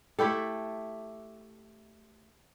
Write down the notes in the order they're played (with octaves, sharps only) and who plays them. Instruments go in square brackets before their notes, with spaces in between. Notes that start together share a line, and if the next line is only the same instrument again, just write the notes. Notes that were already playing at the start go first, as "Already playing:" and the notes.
[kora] A3 E4 G4 A4